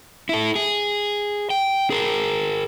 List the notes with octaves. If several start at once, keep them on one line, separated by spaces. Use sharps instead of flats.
E4 A4
G#4
G5
G#4 A#4